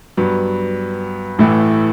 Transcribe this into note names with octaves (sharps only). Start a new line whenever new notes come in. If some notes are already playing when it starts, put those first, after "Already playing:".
G2 F#3 B3
A1 A2 E3 A3 E4